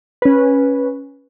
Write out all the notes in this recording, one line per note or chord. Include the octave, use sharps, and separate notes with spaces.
C#4 B4